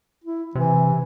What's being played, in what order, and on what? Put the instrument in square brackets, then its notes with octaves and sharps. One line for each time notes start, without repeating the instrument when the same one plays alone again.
[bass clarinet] E4
[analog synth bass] C3 [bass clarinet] E3